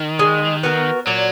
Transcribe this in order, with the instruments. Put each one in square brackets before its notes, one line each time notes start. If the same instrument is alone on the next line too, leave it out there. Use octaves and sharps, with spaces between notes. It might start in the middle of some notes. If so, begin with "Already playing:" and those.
Already playing: [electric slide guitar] D#3
[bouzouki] G#3
B3 F#4 A#4
[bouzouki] A#2 [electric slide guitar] F#3